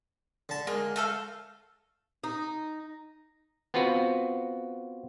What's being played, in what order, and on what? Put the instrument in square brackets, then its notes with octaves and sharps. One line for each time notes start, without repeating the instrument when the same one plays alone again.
[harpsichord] D3 A5
[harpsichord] G#3 [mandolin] A#3
[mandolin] A3 A4 F5
[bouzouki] D#4
[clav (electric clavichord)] B3 C4 F4 F#4 B4